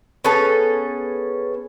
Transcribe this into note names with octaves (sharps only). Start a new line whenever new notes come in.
B3 C#4 G#4 A4